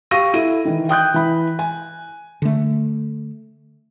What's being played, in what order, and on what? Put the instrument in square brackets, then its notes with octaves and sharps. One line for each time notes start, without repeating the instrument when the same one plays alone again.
[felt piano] G4 F5 C#6 A#6 D#7
E4 A4 D#7
D#3 E3
G5 D#6 F#6 G6
E3 B5
G#5
[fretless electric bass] D3 A3